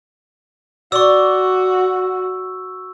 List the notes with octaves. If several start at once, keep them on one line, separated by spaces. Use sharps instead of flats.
F#4 D5 C#6 E6